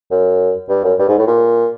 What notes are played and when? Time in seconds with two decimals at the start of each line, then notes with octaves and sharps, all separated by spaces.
0.11 F#2
0.69 G2
0.84 F#2
0.99 G2
1.08 G#2
1.18 A2
1.27 A#2